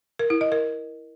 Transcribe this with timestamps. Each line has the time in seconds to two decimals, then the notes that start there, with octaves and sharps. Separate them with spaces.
0.19 A#4
0.30 E4
0.41 D#5
0.52 A#4